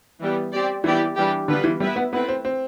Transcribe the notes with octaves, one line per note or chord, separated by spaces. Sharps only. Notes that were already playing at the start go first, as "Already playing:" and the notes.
E3 G3 B3
C4 G4 D5
E3 G3 B3 E4 G4 D5
E3 G3 D4 G4
D3 G3 B3 F4 B4
E3
G3 B3 E4 B4 E5
B3
A3 B3 C4 E4 B4
C4
C4